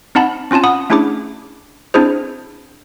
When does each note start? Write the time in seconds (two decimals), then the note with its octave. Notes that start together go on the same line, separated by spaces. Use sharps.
0.15 C4 D#4 F#5 A5 B5
0.51 C4 C#4 F4 G#5 A5
0.64 F#5 B5 D#6
0.90 A3 C#4 D4 E4 G#4 D6
1.94 C4 D4 E4 G#4 C5